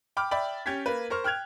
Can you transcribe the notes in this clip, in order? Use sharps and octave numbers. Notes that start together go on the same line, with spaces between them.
G5 B5 D6 F6
D5 E5 G5 B5
C#4 G4 G#6 A6 B6
A#3 B4
A#4 C5 C#6 F6
G5 F6 F#6 G#6 F7